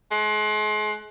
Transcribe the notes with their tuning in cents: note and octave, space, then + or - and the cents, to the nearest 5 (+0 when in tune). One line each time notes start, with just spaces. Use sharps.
G#3 +40